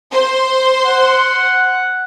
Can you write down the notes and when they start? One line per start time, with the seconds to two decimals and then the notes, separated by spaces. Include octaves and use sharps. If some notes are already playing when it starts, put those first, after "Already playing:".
0.12 C5 C6
0.86 F#5